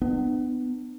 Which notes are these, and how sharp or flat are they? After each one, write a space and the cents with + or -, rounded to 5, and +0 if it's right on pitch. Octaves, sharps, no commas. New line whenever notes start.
B3 +20 D4 +35